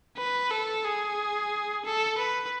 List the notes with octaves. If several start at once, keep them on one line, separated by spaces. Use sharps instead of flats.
B4
A4
G#4
A4
B4